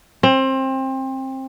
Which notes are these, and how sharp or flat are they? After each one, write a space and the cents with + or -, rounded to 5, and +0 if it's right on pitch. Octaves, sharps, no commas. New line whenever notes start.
C4 +25